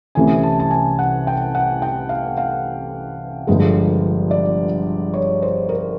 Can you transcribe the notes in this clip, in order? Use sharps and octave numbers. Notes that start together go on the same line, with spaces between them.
C2 C3 E3 A3 C#4 G#5
A5
A5
G#5
F#5
G5
F#5
G5
F5
F5
G1 G2 D3 F3 G#3
D5
C#5
C5
A#4